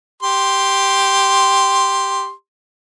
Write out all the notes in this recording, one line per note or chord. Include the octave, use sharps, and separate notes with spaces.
G4 C6